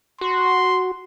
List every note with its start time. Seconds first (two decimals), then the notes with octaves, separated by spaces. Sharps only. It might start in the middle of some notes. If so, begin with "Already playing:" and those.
0.21 F#4 C6